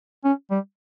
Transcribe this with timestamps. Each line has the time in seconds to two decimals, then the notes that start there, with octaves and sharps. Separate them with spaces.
0.25 C#4
0.51 G3